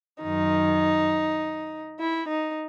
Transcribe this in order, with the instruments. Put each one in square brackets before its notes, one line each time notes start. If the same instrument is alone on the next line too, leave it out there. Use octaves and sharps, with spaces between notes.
[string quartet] F#2 D#3 D#4
E4
D#4